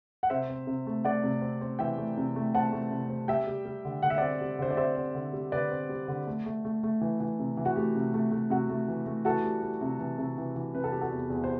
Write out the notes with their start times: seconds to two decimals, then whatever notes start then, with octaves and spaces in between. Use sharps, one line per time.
0.23 F#5
0.30 C3 C5 E5
0.49 C4
0.67 C3
0.87 A3
1.04 A3 D5 F#5
1.24 C3
1.41 C4
1.61 C4
1.79 E3 E5 G5
1.98 A3
2.17 C3
2.36 A3
2.55 C4 F#5 A5
2.72 A3
2.91 C3
3.10 C4
3.28 G3 E5 G5
3.47 G3
3.66 G3
3.85 D3
4.03 D3 F#5
4.10 E5
4.17 C4 D5 F#5
4.41 G3
4.59 D3 C5
4.70 D5
4.77 C4 C5 E5
4.96 C4
5.15 D3
5.33 G3
5.52 D3 B4 D5
5.71 C4
5.89 G3
6.08 D3
6.27 A3
6.46 A3
6.65 A3
6.83 A3
7.01 E3
7.20 E3
7.39 C3
7.57 E3
7.65 F#4
7.76 A3 G4
7.95 C3
8.14 A3
8.32 A3
8.50 C3 F#4
8.70 A3
8.88 E3
9.06 A3
9.25 E3 F#4 A4
9.44 G3
9.63 G3
9.81 C3
9.99 E3
10.18 C3
10.38 E3
10.56 E3
10.74 C3 B4
10.84 A4
10.92 G3 G4
11.01 F#4 A4
11.12 E2
11.30 E2
11.44 C5